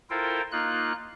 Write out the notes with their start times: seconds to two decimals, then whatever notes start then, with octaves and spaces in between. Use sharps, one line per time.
0.10 E4 F4 A4 A#4 C5 G5
0.52 A#3 D#4 F4 F#6